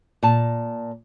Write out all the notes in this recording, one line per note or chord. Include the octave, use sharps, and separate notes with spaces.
A#2 A5